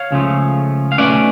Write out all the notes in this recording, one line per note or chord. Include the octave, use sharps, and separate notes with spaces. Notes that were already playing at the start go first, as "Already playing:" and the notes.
Already playing: C#5 F5
C#2 C#3 F3 A3
F5
B1 B2 A3 C#4 B4 D5